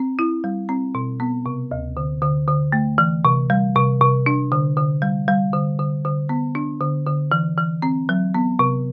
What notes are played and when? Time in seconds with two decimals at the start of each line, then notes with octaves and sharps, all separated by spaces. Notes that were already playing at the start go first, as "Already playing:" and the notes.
Already playing: C4
0.19 E4
0.44 G3
0.69 C4
0.95 B2
1.20 B3
1.46 C3
1.71 D2
1.97 D3
2.22 D3
2.48 D3
2.72 A3
2.98 E3
3.25 C3
3.50 G3
3.76 C3
4.01 C3
4.26 D4
4.52 D3
4.77 D3
5.02 G3
5.28 G3
5.53 D3
5.79 D3
6.05 D3
6.29 B3
6.55 D4
6.81 D3
7.07 D3
7.32 E3
7.58 E3
7.82 C4
8.09 F#3
8.34 B3
8.59 C3